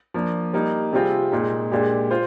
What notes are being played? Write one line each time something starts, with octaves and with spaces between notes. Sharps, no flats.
F3 A#3 D4
G3 A#3 D#4
C3 G3 C4 F4 G#4
A#2 G#3 D#4
A#2 G#3 D4 G4
F4 C5